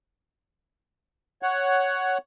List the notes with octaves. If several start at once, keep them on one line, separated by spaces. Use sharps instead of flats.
C#5 F#5